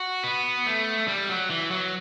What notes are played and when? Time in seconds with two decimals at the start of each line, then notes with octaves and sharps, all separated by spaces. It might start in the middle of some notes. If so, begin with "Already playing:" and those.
Already playing: F#4
0.24 B3
0.67 A3
1.08 G3
1.29 F#3
1.50 E3
1.71 F#3